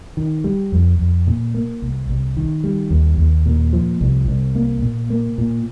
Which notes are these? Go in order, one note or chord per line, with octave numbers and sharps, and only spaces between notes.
D#3
G3
F2
F2
A#2
A#3
C2
C2
D#3
G3
D#2
D#2
A#2
F3
C2
C2
A#3
A#2
A#3
A#2